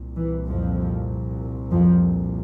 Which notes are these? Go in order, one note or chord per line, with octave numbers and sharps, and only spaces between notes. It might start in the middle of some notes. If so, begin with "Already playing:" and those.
Already playing: C2 A#2
E3
F2 F3
F2 F3